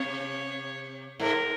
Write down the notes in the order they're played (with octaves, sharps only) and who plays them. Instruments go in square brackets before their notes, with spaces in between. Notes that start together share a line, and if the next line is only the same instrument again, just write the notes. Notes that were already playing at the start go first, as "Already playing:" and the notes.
Already playing: [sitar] C3 [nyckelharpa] C#5
[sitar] G#2 [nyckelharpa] A#4